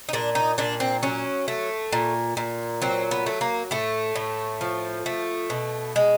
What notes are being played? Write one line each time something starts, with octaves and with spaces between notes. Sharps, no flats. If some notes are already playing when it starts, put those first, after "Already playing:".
D#4
A#2 D4
D#4
A#2 D4
C4
F#3 C#4
A3
A#2
A#2
F#3 C4
B3
A3
A#3
A2 A3
A2
F3
A3
B2
G#3